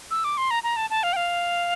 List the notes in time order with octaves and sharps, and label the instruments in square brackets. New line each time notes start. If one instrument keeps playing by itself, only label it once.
[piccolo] E6
D6
C6
A#5
A#5
A5
A5
F5
G5
F5